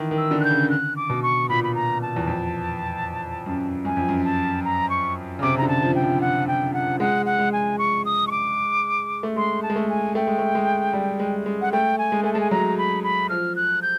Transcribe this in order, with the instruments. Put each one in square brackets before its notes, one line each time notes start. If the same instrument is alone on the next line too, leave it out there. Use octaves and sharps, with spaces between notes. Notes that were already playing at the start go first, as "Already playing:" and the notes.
Already playing: [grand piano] D#3 E3
D#3
[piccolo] E6
[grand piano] D3
[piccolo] F#6
G6
[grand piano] C#3
[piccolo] F#6
D6
[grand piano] B2
[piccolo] C#6
[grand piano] A#2 [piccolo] B5
[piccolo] B5
A#5
A5
[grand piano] E2
F2
F#2
[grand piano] F#2 [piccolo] G#5
[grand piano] F2
F#2
[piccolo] A5
A#5
C#6
[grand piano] C#3
[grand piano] C3 [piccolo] D6
[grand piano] C#3
[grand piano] D3 [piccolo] A#5
[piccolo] A5
[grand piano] F3
[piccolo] G5
[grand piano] F3
[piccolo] F#5
G5
F#5
[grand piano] G#3 [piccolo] F#5
[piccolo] F#5
[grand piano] G#3
[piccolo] G#5
C#6
D#6
C#6
D6
[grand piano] A3
[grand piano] G#3 [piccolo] C6
[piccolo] A5
[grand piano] G#3
A3
[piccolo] G#5
[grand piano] A3 [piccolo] G5
[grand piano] G#3
A3
G#3
G3
G#3
G#3
[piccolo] F#5
[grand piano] A3 [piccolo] G5
[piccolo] G#5
[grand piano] G#3
[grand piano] A3 [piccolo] G#5
[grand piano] G#3 [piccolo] A5
[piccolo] G#5
[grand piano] F#3 [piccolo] A#5
[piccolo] B5
B5
[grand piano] F3 [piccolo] F6
[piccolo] F#6
G6